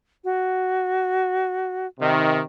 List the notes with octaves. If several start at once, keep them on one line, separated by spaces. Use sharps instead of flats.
F#4
C3 D#3